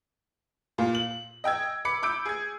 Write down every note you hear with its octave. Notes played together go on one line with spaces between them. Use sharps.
A#2 F4
F#7
D#5 G5 E6 G#6
B5 D6 C#7
B5 D6 E6 G6 D7
G#4 G#6